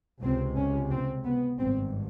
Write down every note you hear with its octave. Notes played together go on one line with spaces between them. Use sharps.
C#2 C3 C4
C#4
C4
B3
G#1 G2 C4